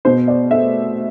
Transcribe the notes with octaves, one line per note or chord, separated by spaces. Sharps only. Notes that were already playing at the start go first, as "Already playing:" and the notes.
B2 C5
D5
A3 E5